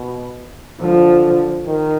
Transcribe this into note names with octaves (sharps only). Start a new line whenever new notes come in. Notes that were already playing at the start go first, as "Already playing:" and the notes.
Already playing: B2
D3 F3
D#3